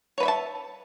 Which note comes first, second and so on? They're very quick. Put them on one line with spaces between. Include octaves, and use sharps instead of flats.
C#5 B4 B5 E5 A5